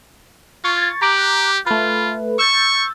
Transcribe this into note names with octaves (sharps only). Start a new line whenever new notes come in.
F4 C#6 G#6 A6
G4 A#5 D6 F#6
A3 F4 B4
C#6 E6 G6 A6